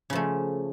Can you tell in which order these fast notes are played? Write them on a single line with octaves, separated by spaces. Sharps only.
C#3 F3 A3